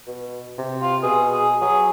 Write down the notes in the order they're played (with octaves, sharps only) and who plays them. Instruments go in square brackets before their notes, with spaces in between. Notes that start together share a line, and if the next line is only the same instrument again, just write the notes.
[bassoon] B2
C3
[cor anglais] F4
[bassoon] B2 [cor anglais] G#4
[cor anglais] G#4
[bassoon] F#3 [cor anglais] G#4